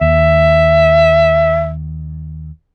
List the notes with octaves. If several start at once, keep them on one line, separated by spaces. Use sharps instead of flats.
D#2 E5